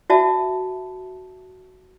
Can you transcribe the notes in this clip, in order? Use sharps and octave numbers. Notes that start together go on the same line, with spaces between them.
F#4 E5 A5